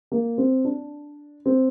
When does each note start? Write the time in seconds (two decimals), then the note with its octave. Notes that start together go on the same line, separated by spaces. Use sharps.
0.12 A#3
0.38 C4
0.65 D4
1.46 C4